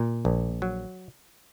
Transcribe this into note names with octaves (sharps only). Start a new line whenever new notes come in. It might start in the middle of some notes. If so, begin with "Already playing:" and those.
Already playing: A#2
A#1
F#3